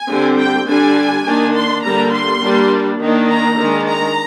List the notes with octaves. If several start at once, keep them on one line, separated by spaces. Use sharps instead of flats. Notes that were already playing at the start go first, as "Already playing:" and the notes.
Already playing: G#5
D3 G3 C4
G5
D3 G3 D4 G#5
D#3 A#3 D4
C6
D3 G3 A#3 D4 A#5
C6
G3 A#3 D4
D#3 A#3 D4
A#5
D#3 G#3 D4
A#5